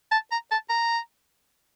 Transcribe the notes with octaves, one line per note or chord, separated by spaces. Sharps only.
A5
A#5
A5
A#5